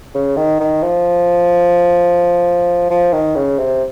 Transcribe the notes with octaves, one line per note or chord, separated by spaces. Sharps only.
C#3
D#3
D#3
F3
F3
D#3
C#3
C3